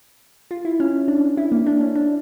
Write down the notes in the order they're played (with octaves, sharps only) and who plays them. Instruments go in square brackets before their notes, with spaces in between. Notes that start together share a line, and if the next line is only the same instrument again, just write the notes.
[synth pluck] F4
E4
C#4
D4
E4
A#3
D4
C#4
D4